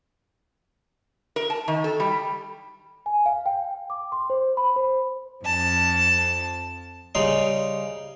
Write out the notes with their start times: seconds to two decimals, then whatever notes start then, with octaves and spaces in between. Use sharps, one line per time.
1.36 A#4
1.50 A5
1.68 D#3
1.84 A4
2.00 G3
3.06 G#5
3.26 F5
3.46 G5
3.90 D6
4.12 C6
4.30 C5
4.57 B5
4.76 C5
5.45 F2 A5
7.15 C#3 G3 D#4 C6